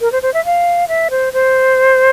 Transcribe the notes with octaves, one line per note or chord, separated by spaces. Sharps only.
A#4
C5
C5
E5
F5
E5
C5
C5